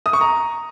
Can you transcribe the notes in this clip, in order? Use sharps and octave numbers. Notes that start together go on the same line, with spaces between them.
D#6
C#6
A#5